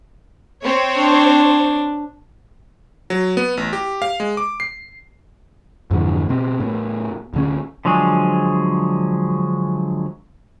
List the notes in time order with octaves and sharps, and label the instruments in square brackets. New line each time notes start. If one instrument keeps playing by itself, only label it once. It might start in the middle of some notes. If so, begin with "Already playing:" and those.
[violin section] C4 C5 C#5
[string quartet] D4
[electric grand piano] F#3
B3
A1
G4
F5
G#3
D6
C7
[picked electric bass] F2 G#2 D3 E3
B2 C4
A2 B3
D1 D3 C#4
[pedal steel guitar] D3 F3 F#3 G#3 G#4